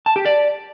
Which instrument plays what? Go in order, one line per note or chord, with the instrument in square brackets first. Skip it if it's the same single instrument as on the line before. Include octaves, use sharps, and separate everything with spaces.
[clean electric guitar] A5
G4
D5